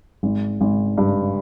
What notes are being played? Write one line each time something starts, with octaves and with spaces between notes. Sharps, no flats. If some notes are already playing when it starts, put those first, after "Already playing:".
G#1
G#1
G2